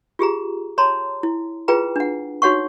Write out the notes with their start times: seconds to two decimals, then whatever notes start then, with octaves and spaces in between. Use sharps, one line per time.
0.19 F4 G4 G#4 A#5
0.78 C#5 A5 A#5 C6
1.23 E4
1.68 F4 G#4 B4 G5 A#5
1.96 D4 F#5
2.42 D#4 F#4 C#5 F#5 C#6